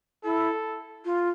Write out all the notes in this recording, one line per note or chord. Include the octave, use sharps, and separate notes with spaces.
E4 A4
F4